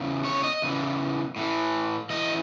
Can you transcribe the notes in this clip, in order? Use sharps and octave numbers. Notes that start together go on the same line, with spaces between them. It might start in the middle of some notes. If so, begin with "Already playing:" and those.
Already playing: E2 C#3
C#5
D#5
E2 C#3 E3
A2 E3
A2 E3 D#5